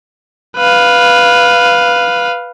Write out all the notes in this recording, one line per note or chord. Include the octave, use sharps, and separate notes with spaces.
B4 F5